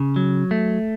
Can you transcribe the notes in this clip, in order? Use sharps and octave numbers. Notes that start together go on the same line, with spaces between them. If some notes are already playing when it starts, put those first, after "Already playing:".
Already playing: C#3
F#3
A3